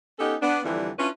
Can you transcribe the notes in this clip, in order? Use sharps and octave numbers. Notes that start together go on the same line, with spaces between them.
B3 C#4 D#4 G4 A4
B3 D4
F2 D3 E3 G3
C#4 D4 E4 F4 B4 C#5